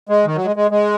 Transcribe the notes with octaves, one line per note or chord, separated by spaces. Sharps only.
G#3
D#3
F#3
G#3
G#3
G#3